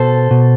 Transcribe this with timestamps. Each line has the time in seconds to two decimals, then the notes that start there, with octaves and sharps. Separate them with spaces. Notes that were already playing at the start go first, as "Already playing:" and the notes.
Already playing: B2 A4 C5
0.31 B2